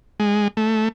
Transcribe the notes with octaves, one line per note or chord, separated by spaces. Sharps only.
G#3
A3